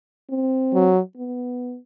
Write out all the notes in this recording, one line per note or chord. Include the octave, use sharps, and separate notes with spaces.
C4
F#3
B3